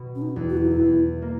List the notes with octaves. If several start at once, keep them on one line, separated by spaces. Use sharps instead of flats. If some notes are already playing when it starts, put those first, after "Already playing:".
Already playing: B2
C#4
D#4
E2
F#4
E4
D#4
E4
E2
A#3